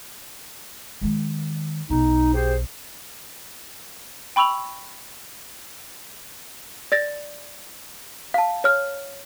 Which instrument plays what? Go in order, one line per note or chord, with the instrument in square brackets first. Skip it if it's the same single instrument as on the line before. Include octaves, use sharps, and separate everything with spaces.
[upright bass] D#3 G#3
[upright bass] B1 [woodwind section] D#4
[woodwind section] G4 G#4 C5
[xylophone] G5 B5 C#6 E6 F7 F#7
D5 A6 A#6
F5 A5
C#5 F6